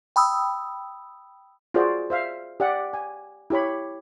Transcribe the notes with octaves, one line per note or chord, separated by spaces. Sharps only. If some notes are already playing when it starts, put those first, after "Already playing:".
G5 B5 D#6 E6
F4 F#4 G#4 C5 D5
C5 E5 F5
G4 D5 F#5
G#5
E4 G4 C#5 B5